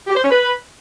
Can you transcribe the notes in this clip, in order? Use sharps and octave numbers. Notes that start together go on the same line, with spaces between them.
G4
C5
C#4
B4